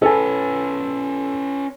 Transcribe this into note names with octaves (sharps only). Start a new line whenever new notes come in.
C#4 A4 B4 G#5